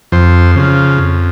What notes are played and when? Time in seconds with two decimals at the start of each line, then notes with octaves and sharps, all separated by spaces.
0.12 F2 C5
0.56 C#3 F3
0.98 F2